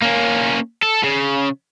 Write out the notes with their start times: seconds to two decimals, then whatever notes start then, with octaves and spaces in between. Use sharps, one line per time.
0.02 A#3 C#4
0.83 A4
1.03 C#3